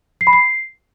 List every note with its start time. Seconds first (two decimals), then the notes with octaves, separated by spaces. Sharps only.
0.21 C7
0.27 B5
0.33 C7